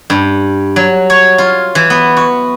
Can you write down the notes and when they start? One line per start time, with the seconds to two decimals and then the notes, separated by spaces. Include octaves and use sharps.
0.10 G2
0.76 F#3
1.10 C#5
1.38 F4
1.75 E3
1.90 B3
2.17 F#4